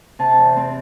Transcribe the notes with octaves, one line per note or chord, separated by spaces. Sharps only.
C3 A5
E2
C4